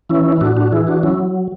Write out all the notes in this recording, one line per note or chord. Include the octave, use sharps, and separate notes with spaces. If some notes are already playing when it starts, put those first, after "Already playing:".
E3 C#4 E4
E4
A2 D4 F#4
D4 F#4
E3 E4 G#4
D4 F#4
F#3 C#4 E4